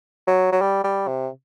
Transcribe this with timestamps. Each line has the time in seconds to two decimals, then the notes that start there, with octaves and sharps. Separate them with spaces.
0.27 F#3
0.52 F#3
0.62 G3
0.84 G3
1.08 C3